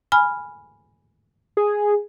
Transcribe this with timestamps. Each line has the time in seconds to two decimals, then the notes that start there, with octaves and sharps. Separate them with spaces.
0.12 G#5 B5 F6
1.57 G#4